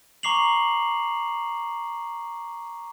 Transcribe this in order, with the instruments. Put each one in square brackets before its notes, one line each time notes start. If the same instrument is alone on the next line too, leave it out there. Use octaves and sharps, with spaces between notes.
[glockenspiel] A#5 C#6 D6 C7 F7 F#7